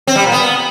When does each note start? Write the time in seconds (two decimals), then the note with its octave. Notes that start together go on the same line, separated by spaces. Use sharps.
0.07 C4
0.16 G3
0.24 A#2
0.32 B3